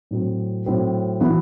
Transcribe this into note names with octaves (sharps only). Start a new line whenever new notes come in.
A2 F#3 C4
A2 F#3 C4
E3 B3 F#4